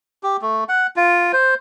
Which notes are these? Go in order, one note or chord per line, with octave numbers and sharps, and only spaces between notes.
G4
A3
F#5
F4
C5